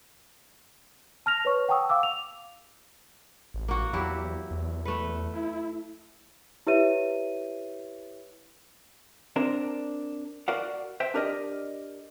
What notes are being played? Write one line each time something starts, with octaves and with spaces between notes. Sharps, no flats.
A5 F6 A#6 F7
B4 C#5 C#6
F#5 G5 A5 C#6 D#6 E6
F5 D6 E6
F7
A1
A#3 F#4
E2 F#3 E4 G4
E2
A3 B4
E4
E4 G4 B4 C#5 E5 D#7
C4 D4 A#4
F#4 A#4 D5 F5 F#5
C5 E5 G5
D4 G4 A#4 D5 D#5